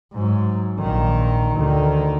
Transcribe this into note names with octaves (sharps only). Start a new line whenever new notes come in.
G#2 F#3
A#1 D#3
D2 D#3